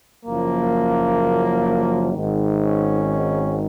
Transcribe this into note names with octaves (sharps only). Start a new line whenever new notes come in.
F#1 F#2 F3 A#3
G#1 G#2 D#3
C#4